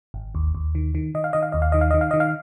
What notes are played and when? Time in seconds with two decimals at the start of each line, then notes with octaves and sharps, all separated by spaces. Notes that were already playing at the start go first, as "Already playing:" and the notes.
0.14 G#1
0.35 D#2
0.55 D#2
0.75 D#3
0.95 D#3
1.15 D#3 D#5
1.24 F5
1.33 D#3 D#5
1.42 F5
1.52 D#2 D#5
1.62 F5
1.72 D#3 D#5
1.81 F5
1.91 D#3 D#5
2.01 F5
2.11 D#3 D#5
2.20 F5